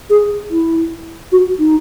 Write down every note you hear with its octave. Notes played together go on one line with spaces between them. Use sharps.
G#4
E4
F#4
D#4